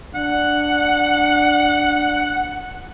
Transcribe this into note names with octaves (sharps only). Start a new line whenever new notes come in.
D4 F#5